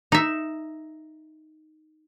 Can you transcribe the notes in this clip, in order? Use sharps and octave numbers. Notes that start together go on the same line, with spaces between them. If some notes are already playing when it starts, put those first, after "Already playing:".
D#4 E5